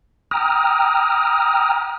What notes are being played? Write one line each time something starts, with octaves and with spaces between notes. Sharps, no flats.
G5 A#5 D#6 F6